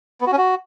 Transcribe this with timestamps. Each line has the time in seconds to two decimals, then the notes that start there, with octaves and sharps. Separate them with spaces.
0.21 B3
0.27 F#4
0.32 C#4
0.38 F#4